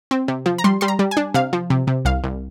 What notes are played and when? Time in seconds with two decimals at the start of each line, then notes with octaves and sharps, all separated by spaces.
0.11 C4
0.28 C3
0.46 F3
0.58 A#5
0.64 G3 C6
0.81 G3 C6
0.88 A#5
0.99 G3
1.11 G#5
1.17 D4
1.34 C3 F5
1.53 F3
1.70 C3
1.87 C3
2.05 C2 F5
2.24 C2